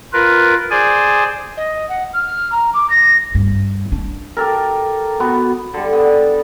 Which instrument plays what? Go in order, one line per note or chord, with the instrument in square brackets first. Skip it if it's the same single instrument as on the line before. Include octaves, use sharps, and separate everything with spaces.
[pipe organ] F4 A#4 B4
G#4 C5 D5 G#5
[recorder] D#5
F#5
F6
A#5
D6
A#6
[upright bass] G2
D4
[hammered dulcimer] G4 A4 A#4
B3 F#4 B4
D3 G3
B3